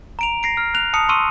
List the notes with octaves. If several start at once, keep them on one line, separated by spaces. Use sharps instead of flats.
A#5 D7 F7
A#6 C7 D7
F6
F#6 F7
A5 D#6 C#7
C6 C#6 E6 D#7